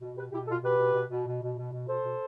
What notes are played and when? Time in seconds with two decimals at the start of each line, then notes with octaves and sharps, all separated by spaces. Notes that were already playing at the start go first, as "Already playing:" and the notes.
0.01 B2
0.16 B2 G4 B4
0.32 B2 E4 G4
0.47 B2 F4 A4
0.63 B2 G4 B4
0.79 B2
0.94 B2
1.10 B2
1.27 B2
1.42 B2
1.57 B2
1.72 B2
1.88 B2 A4 C5
2.04 B2